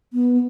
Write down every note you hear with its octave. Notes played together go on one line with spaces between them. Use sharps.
B3